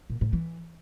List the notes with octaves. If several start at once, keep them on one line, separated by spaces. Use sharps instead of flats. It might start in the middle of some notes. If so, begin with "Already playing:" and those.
A#2
A2
E3